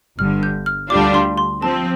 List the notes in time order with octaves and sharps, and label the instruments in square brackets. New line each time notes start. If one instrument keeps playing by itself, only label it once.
[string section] G1 G2 D3 [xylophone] F6
[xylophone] G6
F6
[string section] D2 D3 G3 D4 F4 [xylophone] D6
[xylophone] C6
C6
[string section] F3 C4 [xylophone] A5